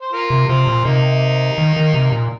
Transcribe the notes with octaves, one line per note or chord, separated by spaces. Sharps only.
C5
F4 A#4
C3
C3 C4 F4
A#2
C3 A#3 D#4
D#3
D#3
C3
A#2